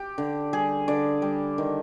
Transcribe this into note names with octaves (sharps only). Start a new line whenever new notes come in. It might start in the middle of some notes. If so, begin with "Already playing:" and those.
Already playing: G4
D3
G3 G#4
D3 D5
G3
D#3